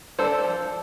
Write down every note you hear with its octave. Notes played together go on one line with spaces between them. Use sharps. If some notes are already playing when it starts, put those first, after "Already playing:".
D4 A4 C5
F3